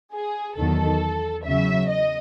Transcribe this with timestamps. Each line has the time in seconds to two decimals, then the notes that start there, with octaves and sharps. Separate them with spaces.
0.13 G#4
0.57 E2 D#3 F#3 A4
1.44 E2 C#3 F#3 E5
1.89 D#5